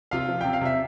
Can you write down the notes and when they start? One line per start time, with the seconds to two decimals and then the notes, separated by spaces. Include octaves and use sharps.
0.11 C3 F4 F5
0.28 F3
0.41 C3 G5
0.53 F5
0.61 C3 E5